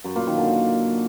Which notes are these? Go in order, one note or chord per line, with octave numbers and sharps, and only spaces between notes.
F#2
A#2
D#3
D3